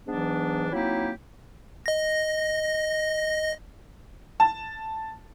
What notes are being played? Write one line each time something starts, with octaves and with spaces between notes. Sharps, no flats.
G#2 E3 F#3 B3 D4
F#3 A#3 C4 D#4 E4 G4
D#5 A#6
A5